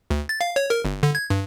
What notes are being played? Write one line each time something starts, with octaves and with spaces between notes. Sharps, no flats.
D2
A6
F5
C#5
A#4
G1
D3
G#6
G2